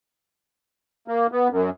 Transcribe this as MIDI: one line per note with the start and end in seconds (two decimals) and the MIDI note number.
1.08 1.27 58
1.32 1.48 59
1.50 1.70 42